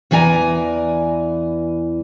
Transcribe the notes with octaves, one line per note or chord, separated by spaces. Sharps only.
E2 E3 D5 G#5 A#5